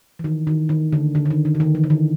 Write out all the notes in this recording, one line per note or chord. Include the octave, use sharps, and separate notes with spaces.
E3
D#3
D#3
D#3
D3
D3
D3
D#3
D#3
D3
D#3
E3
D3
D#3